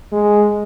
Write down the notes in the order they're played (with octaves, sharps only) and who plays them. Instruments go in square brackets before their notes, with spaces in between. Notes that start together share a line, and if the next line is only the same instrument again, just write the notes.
[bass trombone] G#3